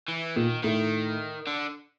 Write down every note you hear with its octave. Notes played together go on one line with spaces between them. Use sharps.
E3
A#2 D#3
A2 D#3
D3